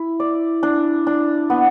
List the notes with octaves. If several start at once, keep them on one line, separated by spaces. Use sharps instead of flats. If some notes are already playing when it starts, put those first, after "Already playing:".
Already playing: E4
D5
D4
D4
B3